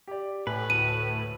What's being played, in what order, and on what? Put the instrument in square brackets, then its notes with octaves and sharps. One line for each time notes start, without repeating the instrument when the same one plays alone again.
[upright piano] G4 D5
[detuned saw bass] A2 [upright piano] G4 G#5 [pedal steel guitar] B4
[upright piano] D2 [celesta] D#7